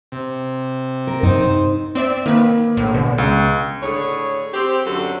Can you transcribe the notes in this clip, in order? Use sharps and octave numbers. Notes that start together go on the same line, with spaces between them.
C3
A#4
G2 D#4 C5
C4 D5 E5
D#3 A#3 B4
A#1 A2
B2 D3
C#2
A2 D3 G#4 C#5
C4 G4
F#2 D3 F#4 A4